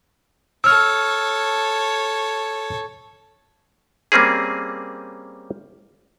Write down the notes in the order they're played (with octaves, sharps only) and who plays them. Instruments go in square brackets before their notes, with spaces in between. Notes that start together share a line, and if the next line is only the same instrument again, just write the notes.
[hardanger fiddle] A4 C#5 [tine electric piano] E6 F6
[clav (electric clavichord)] G3 A#3 C4 C#4 G#4